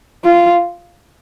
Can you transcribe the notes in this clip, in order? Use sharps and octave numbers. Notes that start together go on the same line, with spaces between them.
F4